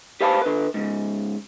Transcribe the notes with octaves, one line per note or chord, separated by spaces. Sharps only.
G4 B4 C5 F5 A5 B5
D3 B4
G#2 C#3